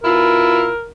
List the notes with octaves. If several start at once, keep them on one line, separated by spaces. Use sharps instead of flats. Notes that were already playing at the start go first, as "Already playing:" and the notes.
B2 E4 F4 A#4